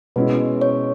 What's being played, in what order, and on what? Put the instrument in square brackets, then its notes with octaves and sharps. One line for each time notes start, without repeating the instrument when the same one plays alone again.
[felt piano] B2 G#3 C#4 E4 [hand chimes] B4
[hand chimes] C#5